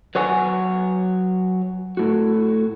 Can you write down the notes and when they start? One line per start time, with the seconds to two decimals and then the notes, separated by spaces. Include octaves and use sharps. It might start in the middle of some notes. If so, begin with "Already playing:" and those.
0.15 F#3 B4 C#5 F#5 G#5
1.97 A2 F#4